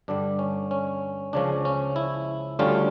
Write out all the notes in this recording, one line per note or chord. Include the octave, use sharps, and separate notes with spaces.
G2 D3 G3 D4
C#4
C#4
C#2 C#3 F3 C#4 D4
C#4
E4
D2 D3 G3 C#4 F4